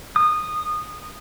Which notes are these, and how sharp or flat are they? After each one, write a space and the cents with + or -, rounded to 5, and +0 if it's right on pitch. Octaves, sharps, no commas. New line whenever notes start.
D#6 -15